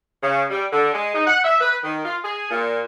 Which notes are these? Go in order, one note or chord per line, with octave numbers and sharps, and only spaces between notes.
C#3
G3
D3
G#3
D#4
F#5
E5
B4
D#3
F4
G#4
A#2